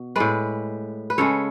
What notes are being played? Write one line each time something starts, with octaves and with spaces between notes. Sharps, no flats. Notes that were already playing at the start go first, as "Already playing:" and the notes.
Already playing: B2
A2 G#3 B4 D5
B4
C#3 G#3 A4 C#5